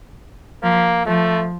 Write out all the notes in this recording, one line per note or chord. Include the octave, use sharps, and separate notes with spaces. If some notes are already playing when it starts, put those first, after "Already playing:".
F3 A#3
F3 A3